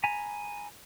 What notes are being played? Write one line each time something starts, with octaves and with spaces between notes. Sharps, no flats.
G#5 A#5 B5